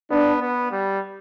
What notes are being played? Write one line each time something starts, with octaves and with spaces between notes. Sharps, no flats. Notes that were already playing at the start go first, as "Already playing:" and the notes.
B3 D4
B3
G3